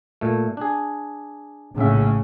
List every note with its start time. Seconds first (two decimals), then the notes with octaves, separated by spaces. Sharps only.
0.21 A#2 A3
0.57 D4 G#4
1.78 A#1 A2 C#3 E5